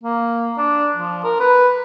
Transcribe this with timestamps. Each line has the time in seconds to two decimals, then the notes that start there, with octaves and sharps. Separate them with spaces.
0.04 A#3
0.58 D4
0.96 F3
1.24 A#4
1.40 B4